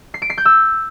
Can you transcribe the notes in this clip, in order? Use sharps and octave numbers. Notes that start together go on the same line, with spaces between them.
C7
D7
C7
G6
E6